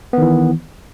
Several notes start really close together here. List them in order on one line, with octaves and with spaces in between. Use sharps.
B3 D#3 E3